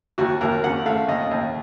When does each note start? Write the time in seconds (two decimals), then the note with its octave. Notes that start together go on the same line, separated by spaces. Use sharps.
0.18 D#2 F#4
0.41 D#2 A#4
0.64 C#3 F#5
0.86 A3 F5
1.08 D#2 D#5
1.31 D#2